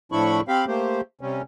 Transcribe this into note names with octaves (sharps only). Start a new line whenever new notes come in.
A2 F3 D4 E4 B5 C#6
C4 G4 F5 B5
A3 A#3 G4 C5
C3 G3 C#4